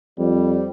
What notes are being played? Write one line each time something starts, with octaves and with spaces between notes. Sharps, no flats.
F2 G3